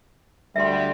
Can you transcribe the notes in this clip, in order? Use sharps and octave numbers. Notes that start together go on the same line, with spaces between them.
D2 G3 E5 C6